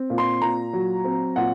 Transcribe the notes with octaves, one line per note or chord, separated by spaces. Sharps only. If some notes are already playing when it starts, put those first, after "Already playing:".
Already playing: C4
A#2
C6
A#2 A#5
F#3
C4
A#2 F#5